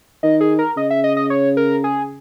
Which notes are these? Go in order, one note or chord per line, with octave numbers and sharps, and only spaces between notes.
D#3 D#5
G#4
A#4
C#3 D#5
E5
D#5
D#5
C#5
A#4
G#4